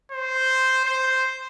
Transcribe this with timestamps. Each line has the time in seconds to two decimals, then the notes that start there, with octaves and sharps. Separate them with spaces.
0.12 C5
0.85 C5